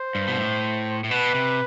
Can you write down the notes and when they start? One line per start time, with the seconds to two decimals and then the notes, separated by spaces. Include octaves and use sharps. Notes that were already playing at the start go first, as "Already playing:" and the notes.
Already playing: C5
0.15 G2
0.28 B2
0.38 A2
1.04 A2
1.11 B2 B4
1.34 C3